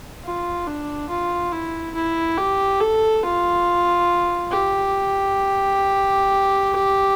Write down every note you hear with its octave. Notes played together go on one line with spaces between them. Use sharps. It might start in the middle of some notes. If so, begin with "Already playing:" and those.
F4
D4
F4
E4
E4
G4
A4
F4
G4